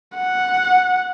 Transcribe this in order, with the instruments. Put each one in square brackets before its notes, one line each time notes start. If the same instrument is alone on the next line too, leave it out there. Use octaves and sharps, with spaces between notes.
[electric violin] F#5